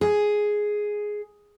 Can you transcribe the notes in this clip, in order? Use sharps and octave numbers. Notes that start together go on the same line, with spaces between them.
G#4